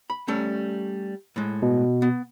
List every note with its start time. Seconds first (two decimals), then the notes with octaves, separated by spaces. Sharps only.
0.10 B5
0.28 G3 A3 C#4
1.36 A2 G#3
1.62 B2
2.02 B3